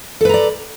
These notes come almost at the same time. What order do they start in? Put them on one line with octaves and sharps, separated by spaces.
A4 B4 A#5 D5